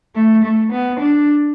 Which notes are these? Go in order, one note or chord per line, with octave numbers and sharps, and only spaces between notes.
A3
A3
B3
D4